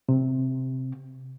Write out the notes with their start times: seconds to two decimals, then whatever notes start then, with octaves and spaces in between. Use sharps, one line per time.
0.09 C3